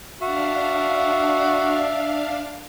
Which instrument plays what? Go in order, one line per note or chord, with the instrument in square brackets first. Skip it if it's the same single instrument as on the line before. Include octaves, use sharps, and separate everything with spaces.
[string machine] D4 F5 [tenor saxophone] F#4 [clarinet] E5